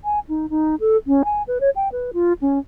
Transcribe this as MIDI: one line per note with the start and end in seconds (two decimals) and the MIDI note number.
0.04 0.19 80
0.29 0.46 63
0.50 0.75 63
0.80 0.97 69
1.07 1.22 61
1.25 1.42 80
1.47 1.58 71
1.60 1.70 73
1.76 1.88 79
1.92 2.11 71
2.13 2.33 65
2.41 2.59 61